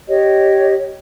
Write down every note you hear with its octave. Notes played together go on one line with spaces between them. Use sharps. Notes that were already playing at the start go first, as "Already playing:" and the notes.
G4 C#5 D#5